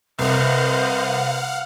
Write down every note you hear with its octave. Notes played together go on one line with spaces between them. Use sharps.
C2 B4 C5 D#5 F5 F#5